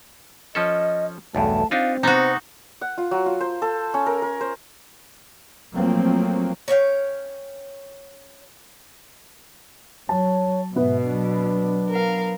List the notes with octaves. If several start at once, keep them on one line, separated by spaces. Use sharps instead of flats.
F3 C#4 A4 D#5
B1 E2 G2 A3 A5
C4 D4 D#4 F4 F5
C3 B3 D#4 F#4 C5
F#5
F4
F#3
F4
C5
A4
C#4
A#4
A#4
C5
F3 F#3 A3 A#3 C4
C#4 C#5 F5 G5
F#3 C#5 A5
G#2 B2 B3 B4 E5
F#3 D4
A#4 F5